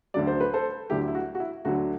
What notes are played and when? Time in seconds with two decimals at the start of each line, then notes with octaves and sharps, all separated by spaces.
0.14 D2 D3 F#3 D5
0.27 C5
0.41 B4
0.53 A4 C5
0.90 D2 D3 F#3 E4 G4
1.08 E4
1.15 F#4
1.35 F#4
1.40 E4
1.65 D2 D3 F#3 F#4